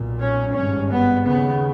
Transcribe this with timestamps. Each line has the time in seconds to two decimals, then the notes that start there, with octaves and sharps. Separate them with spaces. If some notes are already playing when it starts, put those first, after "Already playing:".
Already playing: B1 A#2
0.19 C#4
0.55 G#1 G2 C#4
0.91 B3
1.27 D#2 C#3 B3